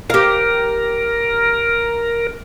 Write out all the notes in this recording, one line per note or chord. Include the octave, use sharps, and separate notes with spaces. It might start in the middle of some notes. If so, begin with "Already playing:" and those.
G4 A#4 F5